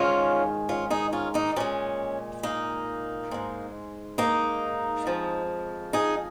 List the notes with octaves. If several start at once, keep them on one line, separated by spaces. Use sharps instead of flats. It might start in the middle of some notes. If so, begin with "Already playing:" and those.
Already playing: G#2 D#3 G#3 C#4 F4
C#4 F4
D#4 G#4
C#4 F4
A#3 D#4
A#2 G#3 C#4
A#3 D#4
G#2 G#3
A#3 D#4
F2 F3 G#3
D#4 G#4